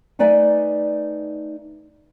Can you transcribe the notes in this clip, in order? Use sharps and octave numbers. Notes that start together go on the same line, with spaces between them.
A3 D#4 B4 D5 E5 G#5